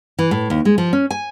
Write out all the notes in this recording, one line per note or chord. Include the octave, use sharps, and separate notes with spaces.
E3
A2
D#2
G#3
F3
C#4
G#5